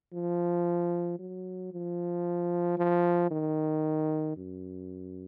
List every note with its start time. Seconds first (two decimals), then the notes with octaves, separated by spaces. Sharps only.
0.14 F3
1.19 F#3
1.72 F3
2.78 F3
3.31 D#3
4.37 F#2